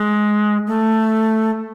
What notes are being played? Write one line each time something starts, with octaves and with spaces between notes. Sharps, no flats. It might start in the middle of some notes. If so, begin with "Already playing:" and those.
Already playing: G#3
A3